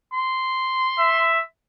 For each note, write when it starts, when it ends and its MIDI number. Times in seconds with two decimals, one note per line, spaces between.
0.13 1.40 84
0.99 1.41 76